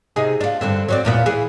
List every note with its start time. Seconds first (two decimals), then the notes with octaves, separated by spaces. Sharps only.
0.16 C3 D#4 G#4
0.41 D4 F4
0.61 G2 D3 C4
0.88 F#3 C4 D5
1.05 E2 A#2 B3
1.26 E3 G#4